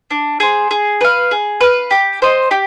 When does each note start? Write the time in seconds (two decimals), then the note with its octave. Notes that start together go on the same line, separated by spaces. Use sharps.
0.11 D4
0.40 G#4 C5
0.71 G#4
1.01 B4 F5
1.31 G#4
1.61 B4 F5
1.91 G4
2.22 C5 D#5
2.51 G4